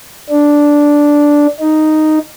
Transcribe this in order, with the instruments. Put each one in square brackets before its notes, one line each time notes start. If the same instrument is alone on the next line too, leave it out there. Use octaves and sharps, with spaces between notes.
[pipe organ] D4
D#4